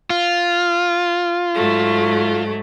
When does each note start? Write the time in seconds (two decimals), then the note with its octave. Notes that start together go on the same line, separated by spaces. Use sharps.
0.10 F4
1.55 G#2 F#3 A3